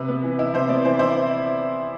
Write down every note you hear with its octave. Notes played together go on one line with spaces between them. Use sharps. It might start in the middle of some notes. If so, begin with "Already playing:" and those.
Already playing: C3 B4
B3
E3
E4
C3 C5
B3 D5
E3 C5
E4 C5